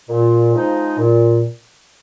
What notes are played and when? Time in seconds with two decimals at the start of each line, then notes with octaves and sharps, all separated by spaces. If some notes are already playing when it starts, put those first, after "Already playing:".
0.09 A#2
0.53 F3 G#3 D#4
0.98 A#2